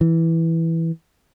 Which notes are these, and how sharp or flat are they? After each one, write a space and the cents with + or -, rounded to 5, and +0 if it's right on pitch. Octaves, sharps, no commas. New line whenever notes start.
E3 -5